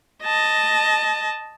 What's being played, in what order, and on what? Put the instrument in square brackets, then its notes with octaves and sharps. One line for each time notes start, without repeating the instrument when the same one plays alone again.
[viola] D#5 A5